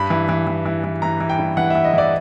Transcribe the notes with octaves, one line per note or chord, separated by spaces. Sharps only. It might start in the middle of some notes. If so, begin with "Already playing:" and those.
Already playing: G2 B5
E3
E3
E3
E3
E3
E3 A#5
E3
G5
G2
E3 F#5
E3 E5
D#5
E3 D5